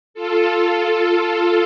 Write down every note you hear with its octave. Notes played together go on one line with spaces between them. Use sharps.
F4 A4